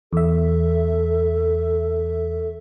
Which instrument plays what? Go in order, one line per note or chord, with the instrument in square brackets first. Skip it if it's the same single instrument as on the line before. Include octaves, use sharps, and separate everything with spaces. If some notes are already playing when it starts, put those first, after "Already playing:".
[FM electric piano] E2 E5 [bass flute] A4